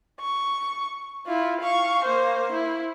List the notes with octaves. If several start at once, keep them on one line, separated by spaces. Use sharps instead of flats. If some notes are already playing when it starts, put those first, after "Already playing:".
C#6
E4 F4
F5 C#6
A#3 C5
E4